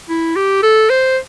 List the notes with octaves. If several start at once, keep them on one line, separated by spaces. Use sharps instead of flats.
E4
G4
A4
C5